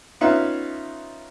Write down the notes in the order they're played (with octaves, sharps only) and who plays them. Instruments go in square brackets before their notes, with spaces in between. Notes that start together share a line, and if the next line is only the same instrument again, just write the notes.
[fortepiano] B3 C#4 D#4 F4 B4 E5